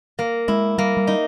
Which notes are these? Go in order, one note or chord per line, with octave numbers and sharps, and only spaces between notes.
A#3
G#3 E4
G3 A#3
G3
D#4